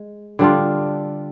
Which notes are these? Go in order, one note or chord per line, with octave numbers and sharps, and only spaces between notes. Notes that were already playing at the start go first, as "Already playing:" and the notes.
Already playing: G#3
D3 G3 D4 F4